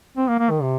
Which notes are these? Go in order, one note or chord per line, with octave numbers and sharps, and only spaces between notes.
C4
A#3
A#3
D#3
C3